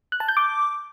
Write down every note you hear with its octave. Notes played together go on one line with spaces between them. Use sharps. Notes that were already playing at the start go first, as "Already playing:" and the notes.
F#6
A5
G6
D6